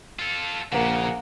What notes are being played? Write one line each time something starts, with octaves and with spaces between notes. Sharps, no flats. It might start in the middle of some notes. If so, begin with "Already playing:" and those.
F4 A4
A#1 C#3 A#3 F#5